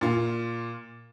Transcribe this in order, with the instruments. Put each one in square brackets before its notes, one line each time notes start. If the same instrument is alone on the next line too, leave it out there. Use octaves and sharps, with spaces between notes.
[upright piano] A#2 F4